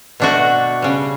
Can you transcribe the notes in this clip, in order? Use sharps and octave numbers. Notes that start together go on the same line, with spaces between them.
B2 A3 D4 F#4
C#3 G3